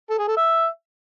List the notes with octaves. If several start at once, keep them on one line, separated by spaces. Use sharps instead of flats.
A4
G#4
A4
E5